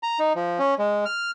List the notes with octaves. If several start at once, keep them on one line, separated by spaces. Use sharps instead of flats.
A#5
D#4
F3
C#4
G#3
F6